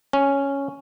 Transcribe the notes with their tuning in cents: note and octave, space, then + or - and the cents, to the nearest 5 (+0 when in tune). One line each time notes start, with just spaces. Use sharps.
C#4 +0